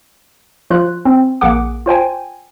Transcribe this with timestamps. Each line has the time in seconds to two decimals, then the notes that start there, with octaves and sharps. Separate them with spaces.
0.70 F3 F4 F#6
1.05 C4
1.41 A#1 A#3 G#4 F#5 D6
1.86 F4 C5 G5 G#5